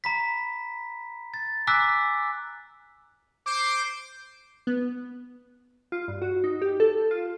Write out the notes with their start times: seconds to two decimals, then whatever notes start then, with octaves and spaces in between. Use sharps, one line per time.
0.04 A#5 B5 B6
1.34 A6
1.67 G#5 A#5 D6 E6 F#6 B6
3.46 C5 D6
4.67 B3
5.92 F4
6.08 G2
6.22 F#4
6.44 D#4
6.62 G4
6.80 A4
7.11 F4